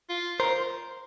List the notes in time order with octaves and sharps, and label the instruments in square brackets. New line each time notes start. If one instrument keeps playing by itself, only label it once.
[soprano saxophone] F4
[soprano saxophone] A#4 [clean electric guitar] C5